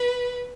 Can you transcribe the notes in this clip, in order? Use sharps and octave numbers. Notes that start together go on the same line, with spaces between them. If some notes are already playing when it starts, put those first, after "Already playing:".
Already playing: B4